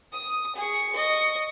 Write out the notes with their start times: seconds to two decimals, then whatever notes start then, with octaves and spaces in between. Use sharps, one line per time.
0.12 D#6
0.56 G#4 C#6
0.93 D#5 C#6